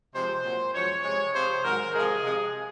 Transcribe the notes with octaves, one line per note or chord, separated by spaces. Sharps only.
C3 F3 G#3 C5
A#2 F#3
F#2 F3 G#3 C#5
C3 F3 G#3 C#5
C3 F3 G#3 C5
G#2 D#3 F#3 A#4
C3 F3 G#3 G#4
C3 F3 G#3